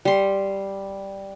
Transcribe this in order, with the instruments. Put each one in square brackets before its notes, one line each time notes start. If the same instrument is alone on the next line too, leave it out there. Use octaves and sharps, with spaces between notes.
[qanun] G3 C6